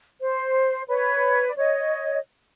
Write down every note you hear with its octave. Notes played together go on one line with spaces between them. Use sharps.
C5
B4 C#5
D5
C#5 D#5